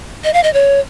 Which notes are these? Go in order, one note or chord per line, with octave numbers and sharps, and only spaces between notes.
D#5
F5
D#5
C#5